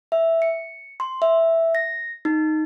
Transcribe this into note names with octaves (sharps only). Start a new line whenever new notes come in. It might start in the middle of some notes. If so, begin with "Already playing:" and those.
E5
C#7
C6
E5
A#6
D#4